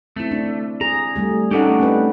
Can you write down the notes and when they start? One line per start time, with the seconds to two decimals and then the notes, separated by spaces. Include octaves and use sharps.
0.16 A3 C4 E4
0.31 D4
0.81 G#4 A#5
1.16 G3 A3 G#4
1.51 A3 C#4 D#4 G4 A4 F#5
1.79 C4 D4 B4